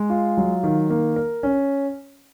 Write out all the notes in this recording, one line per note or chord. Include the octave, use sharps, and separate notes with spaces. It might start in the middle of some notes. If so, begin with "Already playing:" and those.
Already playing: G#3
F4
F#3
D#3
A#3
A#4
C#4